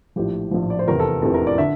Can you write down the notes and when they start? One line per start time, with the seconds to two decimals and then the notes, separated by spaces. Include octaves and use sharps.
0.16 A#1 A2 F3 G4
0.51 A#1 A2 F3
0.70 D5
0.79 C5
0.87 F1 E2 C3 E3 A#4
1.00 A4
1.22 F1 E2 C3 E3 A4
1.34 A#4
1.47 D5
1.58 D3 E5